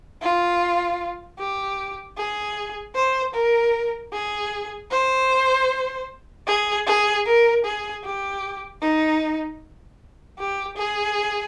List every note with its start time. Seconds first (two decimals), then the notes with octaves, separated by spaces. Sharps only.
0.22 F4
1.39 G4
2.18 G#4
2.95 C5
3.34 A#4
4.13 G#4
4.91 C5
6.47 G#4
6.87 G#4
7.26 A#4
7.65 G#4
8.04 G4
8.82 D#4
10.39 G4
10.77 G#4